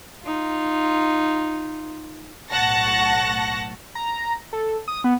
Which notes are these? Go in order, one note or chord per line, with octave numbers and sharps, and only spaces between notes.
D#4 F4
B1 A2 F#5 A5 C#6 A#6
A#5
A4
D#6
B3